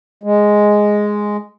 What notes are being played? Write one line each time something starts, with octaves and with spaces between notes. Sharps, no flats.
G#3